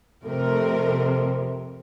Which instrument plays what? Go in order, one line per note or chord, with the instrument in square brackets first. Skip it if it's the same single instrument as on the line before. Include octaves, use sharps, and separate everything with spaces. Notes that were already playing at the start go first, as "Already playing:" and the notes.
[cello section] F2 C3 [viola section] A3 A#4